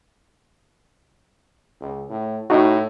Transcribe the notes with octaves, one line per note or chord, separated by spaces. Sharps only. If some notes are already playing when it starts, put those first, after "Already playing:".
C#2
A2
A2 D#4 F#4